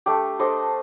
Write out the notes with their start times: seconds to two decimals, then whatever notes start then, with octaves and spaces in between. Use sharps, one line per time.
0.06 A3 D4 G4
0.39 D4 A4 C5 D#5